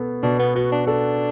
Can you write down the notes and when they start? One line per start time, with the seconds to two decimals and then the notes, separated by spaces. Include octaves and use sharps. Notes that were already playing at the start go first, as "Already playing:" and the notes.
Already playing: B2 B3 A4
0.23 B2 D4
0.39 B3
0.55 B3 F#4
0.72 D4
0.87 D4 A4